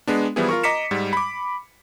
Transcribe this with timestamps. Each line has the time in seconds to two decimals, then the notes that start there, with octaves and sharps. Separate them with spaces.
0.07 G#3 B3 D4
0.36 E3 F3 G3 B3 E4 G#4
0.49 F4 A#4 C#6
0.63 D#5 A#5 D6 B6 C#7 E7
0.91 G#2 G3
1.13 B5 D6